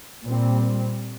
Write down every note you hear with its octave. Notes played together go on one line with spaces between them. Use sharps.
A#2 G3 C4